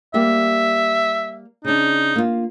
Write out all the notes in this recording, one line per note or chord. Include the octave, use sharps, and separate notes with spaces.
G3 A#3 G4 E5
C#3 D4 D#4
A#3 F4